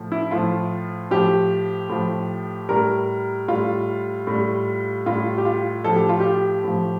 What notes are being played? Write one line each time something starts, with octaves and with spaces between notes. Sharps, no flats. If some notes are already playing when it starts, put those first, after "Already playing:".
Already playing: A2 F3
E4
A2 F3 F4
A2 F3 G4
A2 F3
A2 G3 A#4
A2 G3 F4
A2 G3
A2 G3 F4
G4
F4
A2 F3 A4
G4
F4
G4
A2 F3